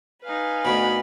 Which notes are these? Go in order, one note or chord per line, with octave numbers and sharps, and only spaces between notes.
D#4 B4 F5 G#5
D2 B2 B5